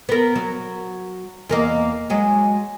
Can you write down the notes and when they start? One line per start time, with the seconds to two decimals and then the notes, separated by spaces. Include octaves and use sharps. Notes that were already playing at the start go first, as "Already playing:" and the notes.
0.09 B3 A#4
0.36 F#3
1.49 E2 A#3 D#5
2.10 F#3 G#3